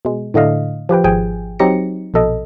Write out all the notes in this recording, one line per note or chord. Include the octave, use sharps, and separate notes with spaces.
B2 G#3
A2 D3 A3 D#5 F5
F3 G4 B4 G5
G#1 F3 G#4 G5 G#5
F#3 C4 D#4 G4 A#6 C#7
A#1 B2 A4 D#5